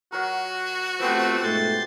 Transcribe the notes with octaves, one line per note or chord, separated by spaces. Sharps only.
F#3 F#4 A#4
F3 A3 B3 C4 G4
G#2 B2 A3 C6 G6 A6